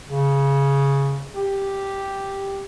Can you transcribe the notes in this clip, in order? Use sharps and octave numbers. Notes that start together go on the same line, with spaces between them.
C#3
G4